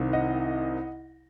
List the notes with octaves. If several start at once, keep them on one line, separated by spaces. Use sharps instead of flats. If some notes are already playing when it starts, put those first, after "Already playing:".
Already playing: C2 C3 D#3
D#5 F#5